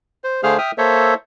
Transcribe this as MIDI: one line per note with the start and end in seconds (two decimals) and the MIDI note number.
0.24 0.41 72
0.43 0.57 50
0.43 0.57 57
0.43 0.57 68
0.43 0.57 72
0.43 0.57 77
0.43 0.57 89
0.58 0.71 76
0.58 0.71 79
0.58 0.71 87
0.58 0.71 89
0.78 1.14 58
0.78 1.14 69
0.78 1.14 72
0.78 1.14 73
0.78 1.14 76